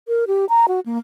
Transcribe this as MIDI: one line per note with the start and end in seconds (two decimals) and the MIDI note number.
0.08 0.24 70
0.27 0.45 67
0.49 0.66 82
0.68 0.80 66
0.86 0.98 58